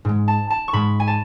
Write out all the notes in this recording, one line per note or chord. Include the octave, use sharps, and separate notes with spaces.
G#2 G#3
A5
A5
C#6
G#2 G#3 B5
G#5
A5